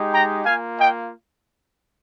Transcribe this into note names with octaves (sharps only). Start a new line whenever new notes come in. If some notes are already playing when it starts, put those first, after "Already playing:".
Already playing: G#3 D#4 G4
G5 A#5
A#3 F4 F5 G#5
D#5 G5